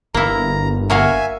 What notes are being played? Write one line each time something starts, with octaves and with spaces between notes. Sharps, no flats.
G1 A#3 E4 A#5
A#3 F#4 E5 F5 G#5